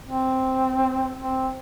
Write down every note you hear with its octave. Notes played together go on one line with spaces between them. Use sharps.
C4
C4